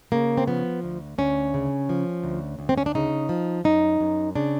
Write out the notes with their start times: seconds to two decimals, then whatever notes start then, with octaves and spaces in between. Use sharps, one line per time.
0.12 C#3 A#3
0.37 C4
0.47 F3 B3
0.83 D2
1.18 D2 C#4
1.54 C#3
1.89 F3
2.24 D2
2.59 D2
2.69 C4
2.78 C#4
2.86 D4
2.95 C#3 D#4
3.29 F3
3.64 F#2 D#4
4.01 F#2
4.35 C#3 D4